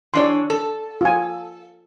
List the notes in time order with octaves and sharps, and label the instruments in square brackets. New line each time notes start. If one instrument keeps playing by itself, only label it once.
[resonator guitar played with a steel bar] E3 D4 C#5 [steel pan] D5 C6
[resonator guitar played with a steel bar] A4
[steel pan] F4 G#5